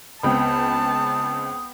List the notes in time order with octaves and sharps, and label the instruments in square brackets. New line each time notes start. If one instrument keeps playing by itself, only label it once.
[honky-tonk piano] C#2 C4 [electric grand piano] B3 G5 B5 [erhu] A5 [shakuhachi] D#6